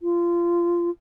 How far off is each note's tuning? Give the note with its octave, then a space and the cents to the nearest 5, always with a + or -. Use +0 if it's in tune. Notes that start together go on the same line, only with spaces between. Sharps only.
F4 -20